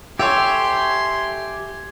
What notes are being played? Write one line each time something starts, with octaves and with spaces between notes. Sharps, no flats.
G4 A4 C#5 E5 G#5 C6